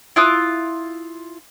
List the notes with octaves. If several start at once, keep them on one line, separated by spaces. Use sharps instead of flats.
E4 F4 D#6 F#6